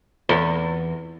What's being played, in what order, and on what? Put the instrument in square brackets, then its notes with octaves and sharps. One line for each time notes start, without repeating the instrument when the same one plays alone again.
[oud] E2